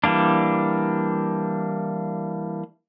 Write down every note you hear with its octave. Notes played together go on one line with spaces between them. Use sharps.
E3 G3 A#3 D4